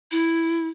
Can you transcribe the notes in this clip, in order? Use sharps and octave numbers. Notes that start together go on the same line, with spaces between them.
E4